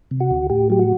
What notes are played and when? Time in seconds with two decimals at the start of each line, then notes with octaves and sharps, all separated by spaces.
0.11 C3
0.20 F#4
0.31 D2
0.50 A2 G4
0.70 F#3 G4
0.79 F#4